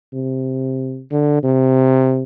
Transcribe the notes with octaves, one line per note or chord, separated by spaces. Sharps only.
C3
D3
C3